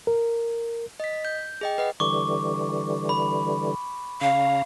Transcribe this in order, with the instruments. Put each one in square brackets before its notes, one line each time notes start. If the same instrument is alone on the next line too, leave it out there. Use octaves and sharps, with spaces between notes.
[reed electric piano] A#4
[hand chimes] D#5 B6
G6
G#4 D#5 G5
B4 D#5 F#5
[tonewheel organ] D3 E3 G3 [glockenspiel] C#6 D6
[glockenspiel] B5
[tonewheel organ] C#3 C#4 A#5 [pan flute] F5